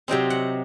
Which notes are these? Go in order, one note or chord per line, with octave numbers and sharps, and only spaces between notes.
C3 F#3 C4 D#4 G5
F#5